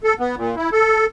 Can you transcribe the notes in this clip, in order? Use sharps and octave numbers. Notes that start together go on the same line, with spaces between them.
A4
B3
A#2
E4
A4